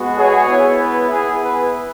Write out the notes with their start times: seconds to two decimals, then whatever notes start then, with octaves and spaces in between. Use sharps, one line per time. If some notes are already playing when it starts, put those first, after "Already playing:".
Already playing: G#3 B3 F#4
0.17 G#4 C#5
0.48 B3 E4
0.79 B4
1.09 B3 E4 G#4
1.41 B4